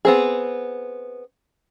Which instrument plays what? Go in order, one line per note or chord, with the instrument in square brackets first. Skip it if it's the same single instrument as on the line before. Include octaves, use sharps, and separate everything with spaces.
[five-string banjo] B3 C4 G#4